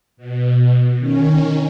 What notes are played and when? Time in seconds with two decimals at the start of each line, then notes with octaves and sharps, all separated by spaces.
0.17 B2
0.98 D#3 C#4